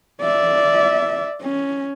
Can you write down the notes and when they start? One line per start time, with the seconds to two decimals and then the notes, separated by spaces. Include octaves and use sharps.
0.21 D5 E5
1.42 C#4